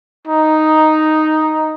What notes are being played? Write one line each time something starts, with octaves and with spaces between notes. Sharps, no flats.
D#4